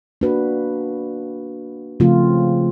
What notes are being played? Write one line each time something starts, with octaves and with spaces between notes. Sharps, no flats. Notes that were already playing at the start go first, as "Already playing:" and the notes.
A#3 D4 F#4 B4
C#3 F3 A3 C4 F4